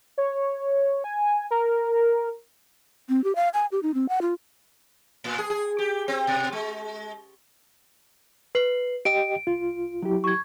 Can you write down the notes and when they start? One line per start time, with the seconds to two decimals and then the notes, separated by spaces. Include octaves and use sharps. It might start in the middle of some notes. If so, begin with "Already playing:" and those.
0.18 C#5
1.04 G#5
1.51 A#4
3.09 C4
3.24 G4
3.36 F5
3.54 G#5
3.72 G4
3.83 D#4
3.94 C4
4.09 F#5
4.22 F4
5.24 A2
5.39 G#4
5.50 G#4
5.79 G4
6.08 C4
6.27 B2
6.53 G#3
8.55 B4 C7 F#7
9.05 G4 D#5 G5 D7
9.47 C2 F4
10.02 F#3 E4 G4
10.24 C#6 G#6